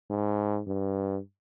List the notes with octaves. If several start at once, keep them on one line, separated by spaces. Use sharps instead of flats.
G#2
G2